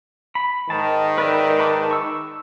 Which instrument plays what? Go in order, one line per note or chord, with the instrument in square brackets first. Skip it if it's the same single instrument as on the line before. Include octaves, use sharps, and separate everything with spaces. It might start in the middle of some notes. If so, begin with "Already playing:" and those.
[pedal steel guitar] B5
[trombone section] G#2 D#3 [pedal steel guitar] A5
[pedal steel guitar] B4 D5 E5
B4 A5 D6
C#6 E6